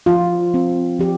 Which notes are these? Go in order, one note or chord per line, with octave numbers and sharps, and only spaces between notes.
F3 F4
C4
F3 G4